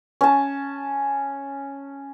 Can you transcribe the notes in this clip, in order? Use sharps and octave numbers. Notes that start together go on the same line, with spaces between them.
C#4 A5